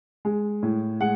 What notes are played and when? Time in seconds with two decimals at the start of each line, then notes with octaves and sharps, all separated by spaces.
0.25 G#3
0.63 A2
1.01 G#3 F#5